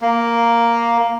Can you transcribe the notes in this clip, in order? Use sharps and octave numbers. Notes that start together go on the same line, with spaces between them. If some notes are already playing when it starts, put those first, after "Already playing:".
A#3